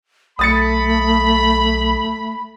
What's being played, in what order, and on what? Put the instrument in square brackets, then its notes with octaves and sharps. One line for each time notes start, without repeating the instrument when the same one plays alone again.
[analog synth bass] B1 [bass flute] A3 [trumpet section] B5 [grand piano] D#6 A6 C#7